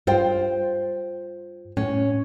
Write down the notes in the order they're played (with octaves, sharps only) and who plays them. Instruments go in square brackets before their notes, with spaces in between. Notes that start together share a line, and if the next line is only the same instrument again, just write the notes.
[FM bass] G2 [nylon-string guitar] F4 C5 G5
[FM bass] A2 [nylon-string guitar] C#4